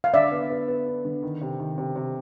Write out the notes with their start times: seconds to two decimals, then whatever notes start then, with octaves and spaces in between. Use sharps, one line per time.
0.04 F5
0.14 D3 D5 E5
0.32 B3
0.50 B3
0.68 B3
0.86 D4
1.05 D3
1.23 D#3
1.41 C3
1.59 D#3
1.78 C3
1.96 C3